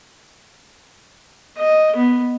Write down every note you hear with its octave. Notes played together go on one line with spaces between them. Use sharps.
D#5
B3